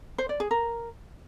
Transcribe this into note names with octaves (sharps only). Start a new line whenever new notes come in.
C5
D5
G#4
A#4